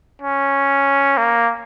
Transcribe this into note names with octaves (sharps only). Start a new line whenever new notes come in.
C#4
A#3